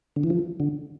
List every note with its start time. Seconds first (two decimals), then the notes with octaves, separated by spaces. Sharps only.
0.16 D3
0.23 E3
0.30 F3
0.60 D3